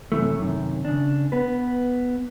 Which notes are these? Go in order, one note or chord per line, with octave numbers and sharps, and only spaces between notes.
F#2 C3 D#3 E3 A3
F#2 C3 D#3
C#3 D4
B3 B4